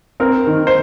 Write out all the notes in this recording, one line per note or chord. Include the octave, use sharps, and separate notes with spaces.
C4 A#4
D#3
C5